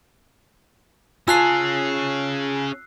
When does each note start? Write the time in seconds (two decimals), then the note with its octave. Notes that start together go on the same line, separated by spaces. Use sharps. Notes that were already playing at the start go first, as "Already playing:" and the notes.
1.28 C#4 F4 G#4 G#5 A5 E6 F#6 C7